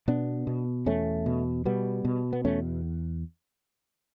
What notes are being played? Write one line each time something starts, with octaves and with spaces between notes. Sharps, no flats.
B2 B3 D4
B2
E2 A3 C#4
B2
B2 G3 B3
B2
B3
E2 A3 C#4